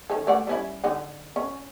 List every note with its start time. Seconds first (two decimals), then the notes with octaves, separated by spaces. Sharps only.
0.10 D#3 C#4 A4
0.27 A3 D5 F#5
0.47 G3 C#4 E4
0.84 D3 D#4 F#5
1.36 C#4